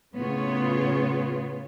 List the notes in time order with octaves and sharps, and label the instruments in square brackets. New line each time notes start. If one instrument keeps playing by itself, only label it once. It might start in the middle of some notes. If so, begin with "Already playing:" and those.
[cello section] A2 C#3 B3 F4 C#5